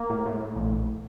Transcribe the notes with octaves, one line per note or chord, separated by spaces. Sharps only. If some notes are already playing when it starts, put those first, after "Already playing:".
Already playing: A#3
A2
A2
A2
A#1
A#1